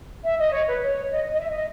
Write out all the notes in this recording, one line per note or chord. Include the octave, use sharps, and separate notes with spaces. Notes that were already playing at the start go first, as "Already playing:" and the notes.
E5
D#5
C#5
B4
C#5
D#5
D#5
E5
D#5